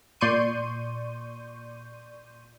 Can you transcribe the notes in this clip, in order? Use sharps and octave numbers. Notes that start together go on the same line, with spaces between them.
A#2 D5 C6 C#6 G6 D#7